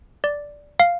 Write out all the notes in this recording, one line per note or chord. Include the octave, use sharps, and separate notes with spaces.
D5
F5